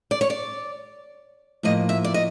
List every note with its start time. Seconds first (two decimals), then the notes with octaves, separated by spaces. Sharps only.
0.11 D5
0.21 C#5
0.30 D5
1.63 A2 F3 A#3 D#5
1.89 E5
2.04 D5
2.14 D#5